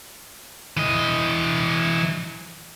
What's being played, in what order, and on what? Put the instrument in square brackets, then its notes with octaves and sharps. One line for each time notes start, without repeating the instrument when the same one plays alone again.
[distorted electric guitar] E3 D#5